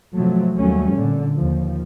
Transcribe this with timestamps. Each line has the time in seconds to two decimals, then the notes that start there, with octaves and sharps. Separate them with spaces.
0.15 G#2 C3 F3 F#3 A3
0.57 D#2 F#3 G3 A3 C#4
0.94 A#2 D3
1.36 D#2 F3